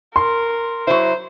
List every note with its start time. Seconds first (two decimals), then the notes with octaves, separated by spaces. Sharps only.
0.16 A#4 C6
0.87 F#3 E4 C5